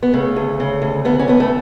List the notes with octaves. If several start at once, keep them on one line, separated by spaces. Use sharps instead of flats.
B3
C#3 A3
D2
C#3
D2
D2 B3
C#4
D2 B3
A3